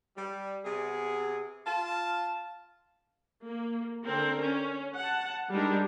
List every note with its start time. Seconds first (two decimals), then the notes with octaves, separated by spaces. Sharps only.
0.17 G3
0.65 C3 B3 G#4
1.66 F4 A5
3.43 A#3
4.05 D3 C4 A#4
4.43 C#4
4.97 F#5 A5
5.52 G3 G#3 D4 D#4 A#4